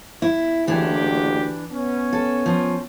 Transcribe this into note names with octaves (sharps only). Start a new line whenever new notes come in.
E4
F#1 D2 E3 D4 G4
B3 C#4
A4
F3